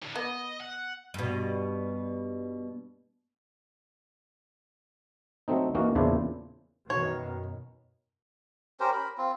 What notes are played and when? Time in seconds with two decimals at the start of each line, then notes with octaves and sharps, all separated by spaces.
0.02 A2 D3
0.16 B3 D#5
0.60 F#5
1.14 G2 B2
5.48 F#3 A3 C4 D#4
5.75 E3 A#3 C#4 D#4 F#4
5.95 E2 A#2 C#3 D4 E4 C5
6.90 F#2 B2 D#3 C#5
8.80 C#4 G4 A#4 C5
8.92 A#4 B5
9.18 C4 F4